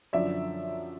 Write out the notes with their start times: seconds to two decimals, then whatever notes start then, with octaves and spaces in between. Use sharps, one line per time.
0.13 F#2 D3 F3 D5 E5